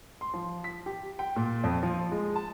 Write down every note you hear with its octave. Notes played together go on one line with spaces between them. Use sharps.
C6
F3
B6
G4
G5
A#2
F2
F3
G#3
A5